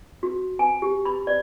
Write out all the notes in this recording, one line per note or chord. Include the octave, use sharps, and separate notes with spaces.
F#4
G#5
G4
B5
D5